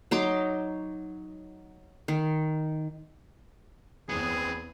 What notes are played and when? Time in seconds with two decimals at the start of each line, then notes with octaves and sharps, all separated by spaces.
0.11 F#3 D#4 C6 D6
2.08 D#3
4.09 E2 B3 C4 G#4